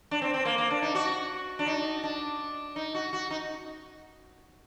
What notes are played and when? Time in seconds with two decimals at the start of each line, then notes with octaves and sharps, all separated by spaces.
0.11 D4
0.22 C4
0.34 C4
0.45 A#3
0.58 A#3
0.71 D4
0.82 D#4
0.95 F#4
1.59 D4
1.66 D#4
2.04 D4
2.76 D#4
2.95 F#4
3.13 F#4
3.30 D#4